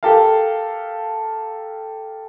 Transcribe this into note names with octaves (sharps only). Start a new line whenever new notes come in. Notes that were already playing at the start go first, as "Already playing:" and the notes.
G4 A4 A#4 F5